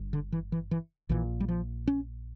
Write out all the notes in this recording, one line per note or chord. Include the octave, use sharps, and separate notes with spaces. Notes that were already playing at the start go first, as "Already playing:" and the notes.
Already playing: G1 G2
D3
E3
E3
E3
A#1 A#2 E3
G3
F3
C#4